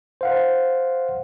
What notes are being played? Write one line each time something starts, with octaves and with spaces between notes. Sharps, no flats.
C5 F5 F#5